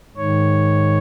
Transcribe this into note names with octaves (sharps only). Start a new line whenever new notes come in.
G#2 D#3 C#5